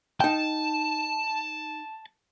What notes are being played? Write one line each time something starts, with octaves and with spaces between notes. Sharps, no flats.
D#4 G5 A5